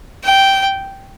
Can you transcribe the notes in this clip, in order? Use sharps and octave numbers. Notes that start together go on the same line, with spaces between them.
G5